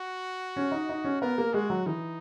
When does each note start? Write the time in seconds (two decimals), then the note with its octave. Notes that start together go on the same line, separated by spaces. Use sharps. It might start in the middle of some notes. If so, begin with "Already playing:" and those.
Already playing: F#4
0.56 C#4
0.72 D#4
0.89 D#4
1.04 C#4
1.21 B3 A#4
1.38 A#3
1.54 G#3 F#4
1.70 F#3
1.86 E3 D#4